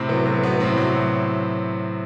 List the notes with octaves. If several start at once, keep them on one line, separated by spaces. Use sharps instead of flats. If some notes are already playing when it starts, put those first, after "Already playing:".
Already playing: A2 C3 C4
F#3 B3
A2 B3
F#3 B3
A2 C3 C4
F#3